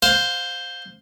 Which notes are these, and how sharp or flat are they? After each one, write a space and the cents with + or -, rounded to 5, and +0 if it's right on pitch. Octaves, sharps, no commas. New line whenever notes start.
C5 +0 F5 +25